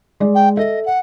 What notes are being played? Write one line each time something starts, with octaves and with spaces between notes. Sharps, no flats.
G#3 D5
G5
A4 D#5 E5
F#5